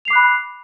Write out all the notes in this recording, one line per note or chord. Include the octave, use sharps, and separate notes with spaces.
B5 D6 F#6 C7 F7